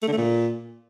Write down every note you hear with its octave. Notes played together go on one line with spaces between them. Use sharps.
A3
D3
A3
A#2